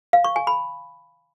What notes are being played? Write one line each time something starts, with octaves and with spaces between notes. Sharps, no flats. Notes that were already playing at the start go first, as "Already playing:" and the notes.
F5
C#6
G#5
B5